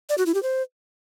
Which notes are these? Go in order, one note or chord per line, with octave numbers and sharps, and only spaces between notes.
D5
F#4
E4
G4
C5